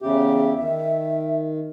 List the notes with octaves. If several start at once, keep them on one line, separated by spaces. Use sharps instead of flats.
E2 C#3 G4 E5
D#3